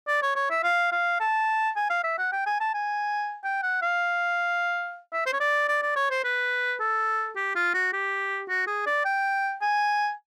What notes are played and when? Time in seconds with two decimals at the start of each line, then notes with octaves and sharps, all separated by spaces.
0.08 D5
0.22 C#5
0.36 C#5
0.50 E5
0.63 F5
0.92 F5
1.20 A5
1.76 G#5
1.90 F5
2.04 E5
2.18 F#5
2.32 G5
2.46 G#5
2.60 A5
2.74 G#5
3.44 G5
3.63 F#5
3.82 F5
5.13 E5
5.26 C5
5.33 C#5
5.40 D5
5.68 D5
5.82 D5
5.96 C#5
6.11 C5
6.24 B4
6.80 A4
7.36 G4
7.56 F4
7.74 F#4
7.93 G4
8.49 F#4
8.67 G#4
8.86 D5
9.05 G5
9.61 G#5